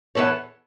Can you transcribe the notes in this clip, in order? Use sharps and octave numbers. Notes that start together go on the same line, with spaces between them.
E2 E3 B3 A4 C#5